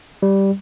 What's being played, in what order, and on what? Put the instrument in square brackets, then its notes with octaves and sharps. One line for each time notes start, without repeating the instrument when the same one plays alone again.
[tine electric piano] G3